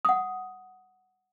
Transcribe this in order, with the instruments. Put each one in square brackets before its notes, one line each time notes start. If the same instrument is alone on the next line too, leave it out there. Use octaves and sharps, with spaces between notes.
[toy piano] F#5 D#6